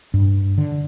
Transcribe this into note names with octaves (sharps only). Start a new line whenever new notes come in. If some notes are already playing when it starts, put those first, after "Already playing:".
G2
D3